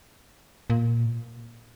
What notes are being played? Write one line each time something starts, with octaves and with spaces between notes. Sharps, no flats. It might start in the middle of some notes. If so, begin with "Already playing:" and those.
A#2